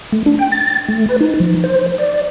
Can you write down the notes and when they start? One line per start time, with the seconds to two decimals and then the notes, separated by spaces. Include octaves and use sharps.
0.12 A3
0.26 D4
0.39 G5
0.52 A6
0.89 A3
1.09 B4
1.21 D#4
1.40 F3
1.64 C5
1.98 D5